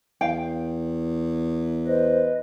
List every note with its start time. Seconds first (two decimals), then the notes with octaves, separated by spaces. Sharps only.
0.21 E2 F5 G5
1.87 B4 C5 D#5